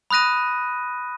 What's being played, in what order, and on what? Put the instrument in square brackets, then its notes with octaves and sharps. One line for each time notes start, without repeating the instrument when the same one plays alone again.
[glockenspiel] B5 D#6 F#6 A#6 D#7